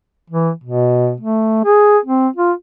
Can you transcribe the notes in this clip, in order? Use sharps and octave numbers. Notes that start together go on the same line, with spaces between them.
E3
B2
A3
G#4
C4
F4